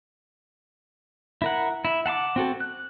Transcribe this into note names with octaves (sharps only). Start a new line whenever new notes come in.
E4 A#4 F#5
E4
F#5 A5 C6 D6
C4 F#4 A4
F#6